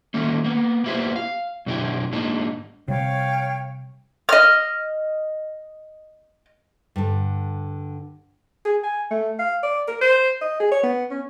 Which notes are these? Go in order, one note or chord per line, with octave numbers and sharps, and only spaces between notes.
D#3 A3 A#3 C#4
A#3 B3
A#3 B3 E4 F4 G4 C5
F5
F#2 B2 D4 E4 G4
G#2 A#3 D4 D#4
C3 G3 C#5 F5 G5
D#5 F6
G2 D3
G#4
G#5
A3
F5
D5
A#4
C5
D#5
G#4
C#5
B3
C#4